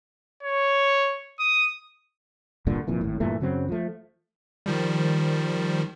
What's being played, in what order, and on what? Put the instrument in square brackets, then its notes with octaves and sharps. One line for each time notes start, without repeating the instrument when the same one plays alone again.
[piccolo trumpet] C#5
D#6
[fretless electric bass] C2 G2 A#2 D3
F1 F2 A#2 E3
G#1 A2
G2 A#2 E3 A3
F#2 C#3 F#3 C4
F3 A3
[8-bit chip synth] D#3 F3 G3